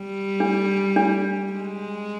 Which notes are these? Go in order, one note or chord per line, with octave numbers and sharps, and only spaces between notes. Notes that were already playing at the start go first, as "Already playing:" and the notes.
Already playing: G3
D4
D4
G#3